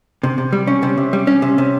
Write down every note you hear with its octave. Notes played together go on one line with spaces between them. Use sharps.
C3
C3
G3
C#4
C3
C3
G3
C#4
C3
C3